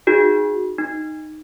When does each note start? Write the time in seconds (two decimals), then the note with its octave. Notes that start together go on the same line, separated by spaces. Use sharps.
0.07 D#4 F#4 G#4
0.78 D#4